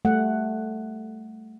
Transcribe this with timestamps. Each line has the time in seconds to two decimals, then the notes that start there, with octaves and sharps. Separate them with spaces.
0.05 G3 A3 F#5